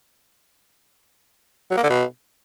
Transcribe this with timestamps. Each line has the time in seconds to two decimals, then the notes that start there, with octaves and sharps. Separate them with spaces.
1.71 F#3
1.77 A#3
1.84 D3
1.90 B2